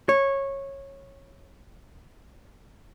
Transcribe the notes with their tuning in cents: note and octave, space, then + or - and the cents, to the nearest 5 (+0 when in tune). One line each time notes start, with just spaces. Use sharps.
C#5 -15